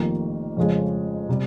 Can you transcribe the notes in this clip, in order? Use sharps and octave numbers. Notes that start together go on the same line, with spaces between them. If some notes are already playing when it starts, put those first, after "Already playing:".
Already playing: F1 F2 D#3 A#3
F2 C#3 F3 G#3
C3 G3